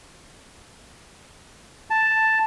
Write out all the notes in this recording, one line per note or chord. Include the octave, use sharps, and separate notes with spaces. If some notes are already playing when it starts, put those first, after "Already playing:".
A5